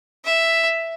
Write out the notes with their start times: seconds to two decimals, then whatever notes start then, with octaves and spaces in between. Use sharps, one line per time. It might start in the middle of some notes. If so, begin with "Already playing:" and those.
0.24 E5